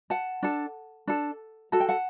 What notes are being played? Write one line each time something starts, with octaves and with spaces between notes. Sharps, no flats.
F#5 A5
D4 A4
D4 A4
F#4 A4 A5
G5
F#5 A5